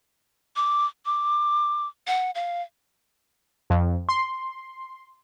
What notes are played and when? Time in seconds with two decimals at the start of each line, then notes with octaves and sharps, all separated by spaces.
0.56 D6
1.06 D6
2.07 F#5
2.35 F5
3.70 F2
4.09 C6